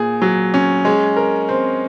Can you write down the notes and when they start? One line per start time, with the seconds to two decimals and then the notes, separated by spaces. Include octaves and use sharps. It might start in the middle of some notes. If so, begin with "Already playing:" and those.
Already playing: A#2 G#4
0.22 F#3
0.54 C#4
0.85 G#3
1.17 A#4
1.49 C4